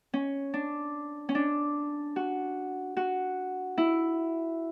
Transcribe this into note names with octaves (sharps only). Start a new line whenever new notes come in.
C#4
D4
C#4
D4
F#4
F#4
E4